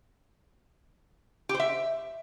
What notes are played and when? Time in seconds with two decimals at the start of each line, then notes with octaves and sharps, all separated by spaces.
1.49 G4
1.54 C5
1.60 E5